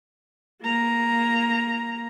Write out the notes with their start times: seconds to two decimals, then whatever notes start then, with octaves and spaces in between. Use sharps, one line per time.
0.62 A#3 A#5